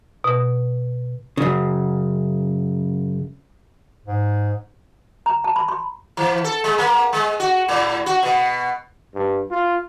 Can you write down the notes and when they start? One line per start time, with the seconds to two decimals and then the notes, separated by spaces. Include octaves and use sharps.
0.24 B2
1.37 F#2 C#3
4.06 G#2
5.26 A#5
5.44 A5
5.56 B5
5.69 C6
6.17 E3
6.44 A4
6.64 G#3
6.78 A#3
7.13 G#3
7.40 F#4
7.68 A2
8.06 F#4
8.23 B2
9.14 G2
9.51 F4